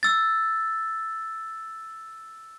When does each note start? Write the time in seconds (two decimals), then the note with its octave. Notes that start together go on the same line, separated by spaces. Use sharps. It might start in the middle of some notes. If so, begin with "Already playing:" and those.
0.03 E6 A6